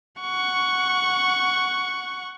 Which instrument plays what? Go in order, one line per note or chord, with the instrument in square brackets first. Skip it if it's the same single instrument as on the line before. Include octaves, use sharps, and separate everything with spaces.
[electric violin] F#5 C#6